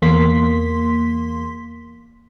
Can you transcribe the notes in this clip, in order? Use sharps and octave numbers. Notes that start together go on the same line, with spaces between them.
E2 A#3 C6 B6